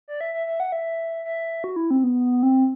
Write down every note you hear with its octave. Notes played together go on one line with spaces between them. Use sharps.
D5
E5
E5
E5
F#5
E5
E5
F#4
E4
C4
B3
C4